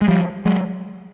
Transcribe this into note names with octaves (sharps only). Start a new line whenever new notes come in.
G#3
F3 G3
F#3 G#3